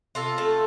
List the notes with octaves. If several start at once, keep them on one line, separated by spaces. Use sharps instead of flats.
C3 F4 A4
A3